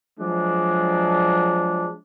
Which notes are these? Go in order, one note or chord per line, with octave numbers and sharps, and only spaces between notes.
F3 F#3 G#3 D4